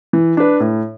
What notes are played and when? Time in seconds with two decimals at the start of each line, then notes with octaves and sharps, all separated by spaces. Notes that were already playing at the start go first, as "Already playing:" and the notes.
0.13 E3
0.37 D4 B4
0.60 A2